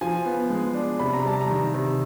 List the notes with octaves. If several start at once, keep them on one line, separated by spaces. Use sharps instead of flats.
F3 G#5
B3
G#3
D4
C3 B5
A#5
G3 A5
A#5
D#3
C3